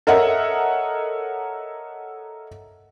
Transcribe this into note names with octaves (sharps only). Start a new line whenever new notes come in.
A4 A#4 C#5 D#5 E5 F#5